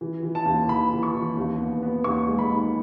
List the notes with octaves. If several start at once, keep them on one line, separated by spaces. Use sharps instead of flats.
E3
E3
A5
D#2
E3 B5
E3
C#6
E3
D#2
B3
B3
D#2 C#6
G#3
B5
D#3